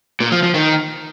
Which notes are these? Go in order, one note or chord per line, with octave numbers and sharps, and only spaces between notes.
A#2
F3
F3
D#3